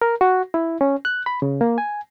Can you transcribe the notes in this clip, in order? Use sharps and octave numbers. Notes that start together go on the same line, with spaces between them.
A#4
F#4
E4
C#4
F#6
B5
C#3
A#3
G#5